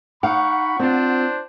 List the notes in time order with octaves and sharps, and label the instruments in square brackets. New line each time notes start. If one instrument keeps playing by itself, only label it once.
[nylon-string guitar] D#4 F5 [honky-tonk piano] F#5 [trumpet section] B5 C#6
[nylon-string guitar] C4 F4 [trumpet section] D4 C5